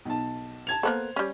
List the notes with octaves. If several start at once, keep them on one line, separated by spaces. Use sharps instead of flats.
B1 A5
A5 G#6 F7
A#3 B3 A4 C5
G3 C#4